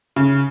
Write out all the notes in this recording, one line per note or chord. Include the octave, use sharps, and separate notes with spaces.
C#3